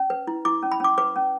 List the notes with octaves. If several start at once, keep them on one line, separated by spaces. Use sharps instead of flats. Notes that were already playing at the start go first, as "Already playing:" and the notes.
Already playing: C#4
B4
E4
E4 D6
C#4
B5
C#4 D6
B4 D6
C#4